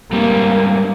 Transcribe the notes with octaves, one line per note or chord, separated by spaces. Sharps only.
G#2 G3 A#3 C4